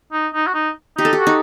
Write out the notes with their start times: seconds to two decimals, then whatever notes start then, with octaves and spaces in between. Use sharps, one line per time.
0.13 D#4
0.34 D#4
0.47 F#4
0.54 D#4
0.98 D#4 G4
1.05 A4
1.13 G4
1.19 F#4
1.27 D#4